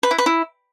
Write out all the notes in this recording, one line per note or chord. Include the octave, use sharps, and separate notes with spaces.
B4
E4
B4
E4